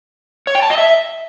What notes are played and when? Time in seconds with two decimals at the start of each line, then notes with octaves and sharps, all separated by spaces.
0.47 C#5
0.55 G5
0.62 A5
0.70 D#5
0.78 E5